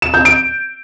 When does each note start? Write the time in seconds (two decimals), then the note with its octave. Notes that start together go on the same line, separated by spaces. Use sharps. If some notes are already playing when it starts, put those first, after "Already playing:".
0.02 E7
0.14 G6
0.25 D7